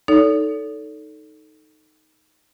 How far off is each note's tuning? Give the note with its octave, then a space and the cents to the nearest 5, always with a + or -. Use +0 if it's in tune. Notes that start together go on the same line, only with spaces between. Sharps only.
D#4 +0 A4 +0 C#5 +45